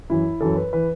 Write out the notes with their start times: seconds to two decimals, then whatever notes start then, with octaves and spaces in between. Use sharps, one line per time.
0.10 F#2 E3 E4
0.41 F#2 E3 A4
0.57 B4
0.73 E3 B4